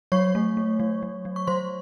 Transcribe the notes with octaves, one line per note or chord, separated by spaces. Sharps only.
F#3 C#5 C#6
A3
A3
F#3
F#3
F#3
C#6
F#3 C5 C6